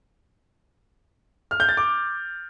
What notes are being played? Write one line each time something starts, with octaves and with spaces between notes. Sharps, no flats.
F6
G6
A6
D6